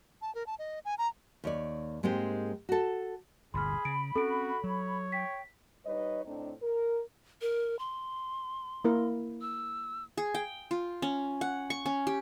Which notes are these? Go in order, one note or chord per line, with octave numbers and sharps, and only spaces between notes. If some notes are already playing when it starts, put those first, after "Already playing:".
A5
A#4
A5
D#5
G#5
A#5
D#2 C#5 D5
G#2 G#3 A#3 C4 G4 G5
F#4 A4
G1 D2 A#2 G#4 B5 C6 F6
C#3 D7
C4 C#4 F#4 A4 D7
F#3 C#5
G5 B6
G3 D#4 B4 C#5 D#5
A2 A3 C4 D4 D#4
A#4
A#4
C6
A#3 E4 A#4
E6
G#4
G5
F4
C#4
F#5
C#6
C#4
G4